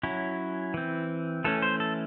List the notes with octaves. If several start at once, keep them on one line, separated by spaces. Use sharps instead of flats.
F#3 C#4 E4
E3 C4
E3 A3 C#4 A4
C5
A4